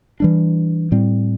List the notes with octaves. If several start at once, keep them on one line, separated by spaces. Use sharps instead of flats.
E3 G3 D4
A2 G3 C4